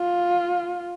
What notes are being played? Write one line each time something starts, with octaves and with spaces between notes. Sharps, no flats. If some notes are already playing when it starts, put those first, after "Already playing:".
Already playing: F4